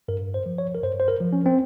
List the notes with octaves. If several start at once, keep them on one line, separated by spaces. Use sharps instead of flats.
G2 A#4
C5
F3
C#5
A#4
G2 C5
C5
A#4
F3
C#4
C4